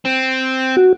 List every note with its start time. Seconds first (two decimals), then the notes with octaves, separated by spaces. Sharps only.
0.06 C4
0.77 F#4